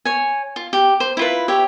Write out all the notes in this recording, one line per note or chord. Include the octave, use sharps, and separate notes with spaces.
C#5 G#5
F4
G4
C5
E4 F4 B4
G4 C#5 E5